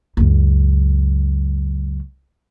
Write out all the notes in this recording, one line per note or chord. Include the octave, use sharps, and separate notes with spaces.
C#2 F#2